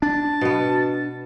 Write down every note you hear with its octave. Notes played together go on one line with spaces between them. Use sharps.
D4 A5
B2 B3